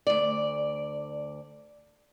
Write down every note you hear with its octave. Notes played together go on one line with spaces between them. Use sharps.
D2 D5